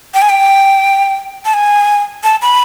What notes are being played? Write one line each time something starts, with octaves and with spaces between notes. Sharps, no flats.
G5
G#5
G5
A5
G#5
A5
B5